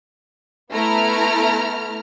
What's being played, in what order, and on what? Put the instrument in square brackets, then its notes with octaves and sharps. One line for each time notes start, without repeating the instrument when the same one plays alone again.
[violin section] A3 B3 E4 A#5 F6